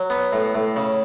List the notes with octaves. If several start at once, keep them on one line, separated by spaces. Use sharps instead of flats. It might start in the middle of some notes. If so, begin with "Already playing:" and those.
Already playing: F#3
B3
A2
A2
C#3